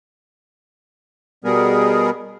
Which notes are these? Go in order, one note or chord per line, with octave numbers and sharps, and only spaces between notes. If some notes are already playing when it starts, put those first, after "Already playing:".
B2 G3 B3 G#4 A#4